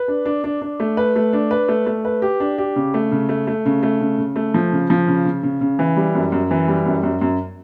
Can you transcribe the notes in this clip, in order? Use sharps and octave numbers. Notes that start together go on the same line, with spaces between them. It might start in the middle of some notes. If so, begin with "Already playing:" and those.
Already playing: B4
D4
D4
D4
D4
A3
B4
A3
D4
B4
A3
A3
B4
G4
D4
G4
C#3
A3
C#3
A3
A3
C#3
A3
C#3
C#3
A3
F3
C#3
F3
C#3
C#3
C#3
C#3
E3
G3
F#2
F#2
E3
G3
F#2
F#2
F#2